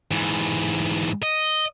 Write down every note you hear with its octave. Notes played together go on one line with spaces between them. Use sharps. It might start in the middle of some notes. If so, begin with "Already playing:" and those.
G#2 E3
D#5